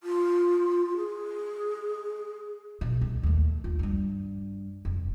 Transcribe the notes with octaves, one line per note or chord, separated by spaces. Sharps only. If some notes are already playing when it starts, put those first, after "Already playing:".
F4
G#4
B2
C2
D#2 A3
F4
G2 G3
F1